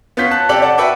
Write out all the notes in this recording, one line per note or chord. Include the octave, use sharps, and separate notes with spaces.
B3 C#4 F4 G6 B6
A5 F#6
C3 G4 A4 D5 G5 F#7
D5 F#5 A5
F#4 B4 E5 F#5 G5 D6